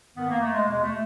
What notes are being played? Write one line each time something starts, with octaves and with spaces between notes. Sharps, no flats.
G2 D#3 B3
A#3
A3
G#3
E2 B2 G#3
A3